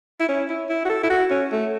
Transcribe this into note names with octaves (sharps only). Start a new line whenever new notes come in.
E4
C#4
E4
E4
F#4
A4
E4
F#4
C#4
A3